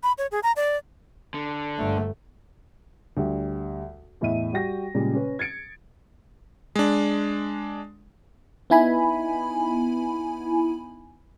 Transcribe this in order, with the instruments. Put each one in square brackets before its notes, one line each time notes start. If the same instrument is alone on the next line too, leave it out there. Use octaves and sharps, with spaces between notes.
[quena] B5
C#5
G#4
A#5
D5
[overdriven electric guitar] D3
[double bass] G1 A3
[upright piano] D2 G3
E2 A2 D#5 E5 D#7
G3 F#4 G5 A#6
A#2 C#3 G3 G#3
C#4 B4
G#6 A6 C#7 D7
[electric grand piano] G#3 D4
[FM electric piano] B3 D#4 E4 G#5 B5